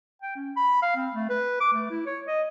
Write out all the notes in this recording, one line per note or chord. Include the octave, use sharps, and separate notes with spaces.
G5
C#4
B5
F5
C4
A3
B4
D6
A3
E4
C#5
D#5